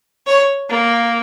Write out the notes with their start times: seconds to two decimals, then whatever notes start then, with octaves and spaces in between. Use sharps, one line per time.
0.27 C#5
0.70 A#3